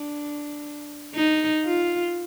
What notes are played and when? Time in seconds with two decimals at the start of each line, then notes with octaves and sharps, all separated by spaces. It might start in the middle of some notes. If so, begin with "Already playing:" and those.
Already playing: D4
1.15 D#4
1.65 F4